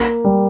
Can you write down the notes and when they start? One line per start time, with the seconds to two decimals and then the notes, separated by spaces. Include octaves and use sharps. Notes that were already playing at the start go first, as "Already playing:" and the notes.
Already playing: A#3
0.25 G3